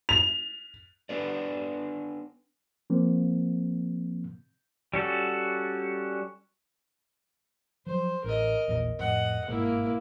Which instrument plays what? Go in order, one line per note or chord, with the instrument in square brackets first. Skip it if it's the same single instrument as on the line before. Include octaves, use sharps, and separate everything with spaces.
[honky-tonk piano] F7
[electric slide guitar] B3 D4 B4 D5
[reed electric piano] F3 A#3 C4
[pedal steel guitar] G3 C#4 F#4 A4
[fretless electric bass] F3 F#3 [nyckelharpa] C5
[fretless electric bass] A1 [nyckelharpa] A#4 D#5
[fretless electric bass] A#1 E2 A#2
[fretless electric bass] F2 A2 [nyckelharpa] D#5 F#5
[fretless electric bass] G1 G#2 B2 [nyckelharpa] A#3 E4